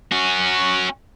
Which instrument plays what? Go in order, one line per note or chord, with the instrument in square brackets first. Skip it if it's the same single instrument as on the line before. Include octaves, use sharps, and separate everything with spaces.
[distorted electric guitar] C#4 F#4